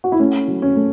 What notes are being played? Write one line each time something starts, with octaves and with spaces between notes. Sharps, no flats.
F#4
E4
A3 C#4
F#3
C#4
A3